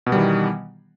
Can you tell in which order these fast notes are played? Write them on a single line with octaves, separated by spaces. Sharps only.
B2 B3 G3 D#3 E3